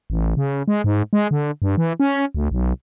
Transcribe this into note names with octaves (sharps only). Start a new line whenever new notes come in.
A1
C#3
G#3
G#2
G#3
D3
G2
E3
C#4
D2
B1